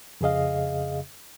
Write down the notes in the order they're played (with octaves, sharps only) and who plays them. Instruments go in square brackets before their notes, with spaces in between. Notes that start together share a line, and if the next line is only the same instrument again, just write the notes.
[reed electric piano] F2 C#3 G#4 D#5 F5